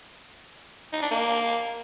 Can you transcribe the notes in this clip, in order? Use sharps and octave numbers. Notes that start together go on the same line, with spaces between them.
D#4
D4
A#3